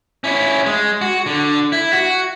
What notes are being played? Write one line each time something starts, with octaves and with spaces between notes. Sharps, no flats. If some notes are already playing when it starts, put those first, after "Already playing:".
C#4 E4
G#3
F#4
D3
E4
F#4